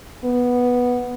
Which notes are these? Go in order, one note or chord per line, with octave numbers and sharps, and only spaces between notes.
B3